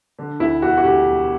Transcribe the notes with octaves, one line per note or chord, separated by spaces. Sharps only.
D3
D2 E4
E1 F#4
F#4
D2 G4
E1